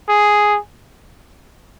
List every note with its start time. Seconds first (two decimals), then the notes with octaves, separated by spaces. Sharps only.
0.09 G#4